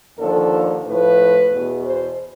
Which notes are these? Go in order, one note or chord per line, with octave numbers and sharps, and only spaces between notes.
D#2 D3 F3 A4
A2 F3 B4
E2 B2
C5